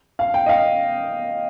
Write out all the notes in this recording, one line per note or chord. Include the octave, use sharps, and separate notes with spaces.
F5
G5
D#5
F5